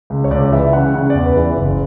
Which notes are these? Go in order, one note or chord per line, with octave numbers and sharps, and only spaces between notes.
C#2
C#5
C#2 D5
E3 E5
C#3 F#5
C#3 F#5
E2 D5
B4
E3
F#1